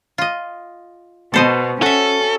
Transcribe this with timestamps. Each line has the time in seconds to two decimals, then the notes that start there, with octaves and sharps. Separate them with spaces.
0.18 F4 D#5
1.34 B2 A4 C5 D#5
1.82 C#4 F#4 A4 E5